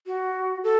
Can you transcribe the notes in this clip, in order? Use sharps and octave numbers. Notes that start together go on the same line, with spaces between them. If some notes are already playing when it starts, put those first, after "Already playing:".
F#4
A4